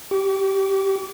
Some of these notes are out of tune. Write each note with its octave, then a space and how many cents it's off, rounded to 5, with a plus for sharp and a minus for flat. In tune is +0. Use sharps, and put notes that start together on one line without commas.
G4 -15 D6 -40